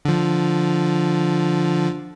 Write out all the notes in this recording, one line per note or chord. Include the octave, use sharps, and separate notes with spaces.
D3 F3